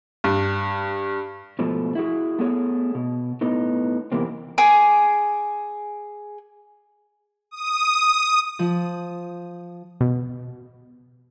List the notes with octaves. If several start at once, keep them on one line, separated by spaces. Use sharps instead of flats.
G2
G#2 B2 F3 A3
E4 F#4 G#4
A3 B3 G#4 C#5
B2
A2 B3 D#4
E2 C3 E3 A#3 C4
G#4 D6
D#6
F3
B2